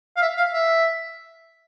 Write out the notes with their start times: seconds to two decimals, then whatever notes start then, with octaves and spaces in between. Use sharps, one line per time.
0.17 F5
0.22 E5
0.37 F5
0.53 E5